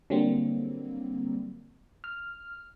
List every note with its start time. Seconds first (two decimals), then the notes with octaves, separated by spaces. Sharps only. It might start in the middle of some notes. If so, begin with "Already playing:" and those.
0.10 D3 F#3 G3 A#3 C4
2.04 F6